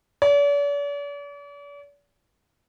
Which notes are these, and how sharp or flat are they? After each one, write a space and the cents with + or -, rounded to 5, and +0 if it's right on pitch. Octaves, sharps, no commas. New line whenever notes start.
D5 -45